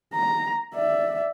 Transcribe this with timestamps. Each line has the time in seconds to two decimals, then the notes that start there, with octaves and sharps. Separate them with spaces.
0.14 A#5
0.74 D5 E5